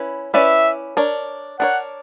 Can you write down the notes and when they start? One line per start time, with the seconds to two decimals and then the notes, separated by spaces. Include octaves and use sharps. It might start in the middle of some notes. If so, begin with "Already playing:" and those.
Already playing: C#4 E4 B4
0.34 C#4 E4 B4 D5 E5
0.97 D4 A#4 C#5
1.60 D4 A#4 C#5 F#5